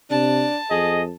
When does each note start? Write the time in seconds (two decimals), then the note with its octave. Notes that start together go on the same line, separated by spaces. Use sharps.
0.11 C3 D4 A5
0.70 F2 G#4 D#5